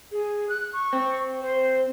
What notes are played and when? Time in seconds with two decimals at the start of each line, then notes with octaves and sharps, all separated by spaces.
0.12 G#4
0.49 F#6
0.73 C#6
0.93 C4
1.41 C5